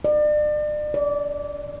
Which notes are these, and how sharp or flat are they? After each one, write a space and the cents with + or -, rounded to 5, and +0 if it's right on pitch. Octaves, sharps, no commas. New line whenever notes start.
D5 +35
D5 -25